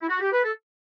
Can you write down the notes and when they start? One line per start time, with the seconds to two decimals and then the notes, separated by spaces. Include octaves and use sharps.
0.01 E4
0.08 F#4
0.20 G4
0.32 B4
0.44 A4